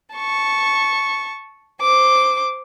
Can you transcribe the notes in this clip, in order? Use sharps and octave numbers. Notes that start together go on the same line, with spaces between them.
A5 C#6
C5 D6